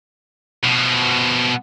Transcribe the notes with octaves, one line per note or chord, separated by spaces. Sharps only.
B2 F3